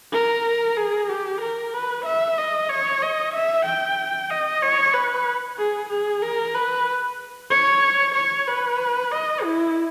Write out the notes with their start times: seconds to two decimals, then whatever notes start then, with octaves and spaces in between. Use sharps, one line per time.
0.13 A#4
0.77 G#4
1.10 G4
1.42 A#4
1.74 B4
2.05 E5
2.38 D#5
2.69 C#5
3.02 D#5
3.34 E5
3.66 G5
4.30 D#5
4.63 C#5
4.94 B4
5.58 G#4
5.90 G#4
6.23 A#4
6.55 B4
7.51 C#5
8.15 C#5
8.48 B4
9.12 D#5
9.43 E4